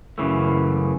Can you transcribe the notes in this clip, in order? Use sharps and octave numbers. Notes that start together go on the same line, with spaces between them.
F#2 C#3 E3 A3